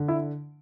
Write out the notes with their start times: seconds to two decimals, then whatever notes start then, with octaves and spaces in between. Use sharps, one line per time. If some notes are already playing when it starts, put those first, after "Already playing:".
Already playing: D3
0.08 E4